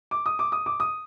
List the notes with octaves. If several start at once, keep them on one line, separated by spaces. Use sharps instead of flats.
D6
D#6
D6
D#6
D6
D#6